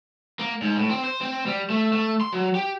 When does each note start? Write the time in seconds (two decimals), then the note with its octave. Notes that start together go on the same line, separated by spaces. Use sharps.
0.39 A#3
0.62 G#2
0.77 A2
0.89 C4
1.04 C5
1.21 C4
1.46 G3
1.70 A3
1.93 A3
2.21 C6
2.33 F#3
2.55 G4